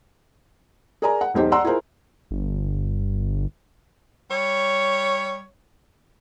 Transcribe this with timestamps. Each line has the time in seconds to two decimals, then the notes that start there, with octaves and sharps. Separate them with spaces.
1.02 G#4 A#4 D5 G#5 A#5
1.21 F#5
1.34 E1 B1 D#4 G4 C5
1.52 D5 F#5 A#5 C6 E6
1.64 E4 F4 G#4 A#4 C5
2.31 G1
4.31 G3 C#5